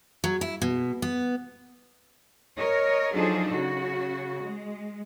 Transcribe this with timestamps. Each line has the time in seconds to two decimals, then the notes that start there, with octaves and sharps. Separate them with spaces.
0.24 F#3
0.41 E4
0.62 B2
1.02 B3
2.56 A#4 C#5 D#5
3.13 F3 F#3 D4 D#4 G#4 A4
3.50 C#3 F#4
4.42 G#3